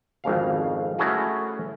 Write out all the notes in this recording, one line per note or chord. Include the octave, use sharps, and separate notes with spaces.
G#1 F2 C#3 F5
A3 C#4 E4 F#4 G#4 A#4